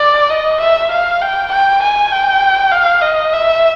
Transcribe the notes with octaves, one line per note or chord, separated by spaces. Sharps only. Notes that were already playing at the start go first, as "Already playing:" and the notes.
Already playing: D5
D#5
E5
F5
G5
G5
G#5
G5
F5
D#5
E5